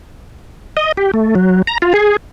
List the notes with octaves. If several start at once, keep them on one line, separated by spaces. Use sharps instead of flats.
D#5
G4
A3
F#3
A#5
F4
G#4